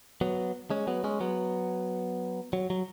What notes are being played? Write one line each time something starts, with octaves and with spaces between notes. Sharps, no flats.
F#3 B3
G#3 C#4
F#3 B3
G#3 C#4
F#3 B3
F#3
F#3